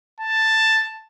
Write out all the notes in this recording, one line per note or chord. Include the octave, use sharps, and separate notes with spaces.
A5